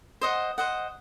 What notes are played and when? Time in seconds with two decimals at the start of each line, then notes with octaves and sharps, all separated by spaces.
0.21 C5 D#5 F#5
0.58 C5 D#5 F#5